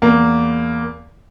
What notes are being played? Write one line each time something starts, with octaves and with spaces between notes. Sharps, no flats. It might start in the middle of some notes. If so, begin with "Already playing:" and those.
E2 A#3